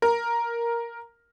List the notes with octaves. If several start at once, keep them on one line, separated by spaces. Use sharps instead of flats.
A#4